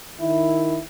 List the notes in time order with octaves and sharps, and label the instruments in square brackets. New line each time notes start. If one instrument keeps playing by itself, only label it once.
[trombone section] D#3 E4